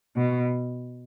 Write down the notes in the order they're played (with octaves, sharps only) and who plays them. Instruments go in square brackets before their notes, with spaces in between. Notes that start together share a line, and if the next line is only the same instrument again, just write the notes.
[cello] B2